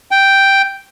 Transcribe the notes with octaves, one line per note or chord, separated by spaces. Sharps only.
G5